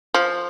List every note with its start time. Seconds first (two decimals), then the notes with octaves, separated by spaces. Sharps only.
0.14 F3